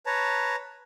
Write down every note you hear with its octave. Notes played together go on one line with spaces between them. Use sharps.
B4 C#5 A5 A#5